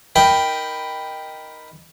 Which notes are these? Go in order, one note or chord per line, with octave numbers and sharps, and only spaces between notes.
D#4 A#4 G5 B5